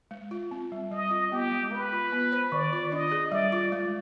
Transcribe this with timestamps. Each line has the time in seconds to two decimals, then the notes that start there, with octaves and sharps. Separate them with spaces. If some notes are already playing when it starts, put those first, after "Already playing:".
0.11 G#3
0.31 F4
0.51 C4
0.72 G3
0.91 G3 D#5
1.11 F4
1.32 B3 G4
1.51 G#3
1.71 G#3 B4
1.92 F4
2.12 B3
2.32 C5
2.52 D#3 D5
2.73 F4
2.92 D4 D#5
3.12 G#4
3.32 G3 D5
3.52 F4
3.72 G#3